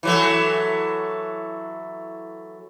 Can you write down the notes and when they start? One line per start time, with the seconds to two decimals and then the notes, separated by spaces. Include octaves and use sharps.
0.03 E3 F#3 A3